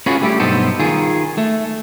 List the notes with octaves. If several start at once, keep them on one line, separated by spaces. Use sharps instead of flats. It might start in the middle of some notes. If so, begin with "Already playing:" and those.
C#4 F4 F#4 G#4 B4
G3 A3 B3 E4 G4
B1 G2 B3 D#4 A4 C5
D#3 F4 G#4
A3